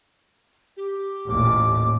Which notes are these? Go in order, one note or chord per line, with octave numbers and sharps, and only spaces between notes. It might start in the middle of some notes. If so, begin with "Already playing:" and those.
G4
A1 D#2 A#2 D6